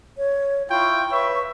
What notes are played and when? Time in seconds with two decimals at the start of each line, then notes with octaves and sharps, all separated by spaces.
0.18 C#5
0.70 E4 F4 G5 C#6
1.12 B4 C#5 E5